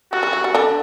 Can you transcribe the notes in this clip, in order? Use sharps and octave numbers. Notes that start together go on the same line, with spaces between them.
G3 F#4
G3
F#3
G3
D3 D4